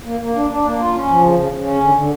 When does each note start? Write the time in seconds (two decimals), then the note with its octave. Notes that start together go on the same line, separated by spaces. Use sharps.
0.05 A#3
0.20 A#3
0.35 D4
0.50 D4
0.64 A#3
0.79 F4
0.94 C#4
1.08 F3
1.22 C#3
1.36 C#3
1.52 C#3
1.65 C#4
1.80 D3
1.95 D3